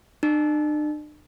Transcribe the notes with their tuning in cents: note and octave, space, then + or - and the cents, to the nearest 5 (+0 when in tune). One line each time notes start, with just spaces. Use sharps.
D4 +45